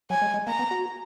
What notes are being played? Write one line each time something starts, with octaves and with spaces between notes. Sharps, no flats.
F#3 G#5
G#3
G#3
A#3 A#5
B3
F#4